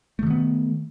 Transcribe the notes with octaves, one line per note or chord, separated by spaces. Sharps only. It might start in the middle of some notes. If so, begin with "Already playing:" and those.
D3 D#3 A3 B3